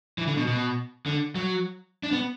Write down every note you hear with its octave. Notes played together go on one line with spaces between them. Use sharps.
E3
D3
B2
B2
D3
F#3
D4
B3